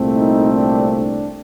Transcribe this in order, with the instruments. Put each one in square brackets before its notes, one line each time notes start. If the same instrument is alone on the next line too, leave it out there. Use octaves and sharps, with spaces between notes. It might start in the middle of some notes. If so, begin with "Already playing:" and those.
Already playing: [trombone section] C2 A#2 A3 C4
D#4
D4
D4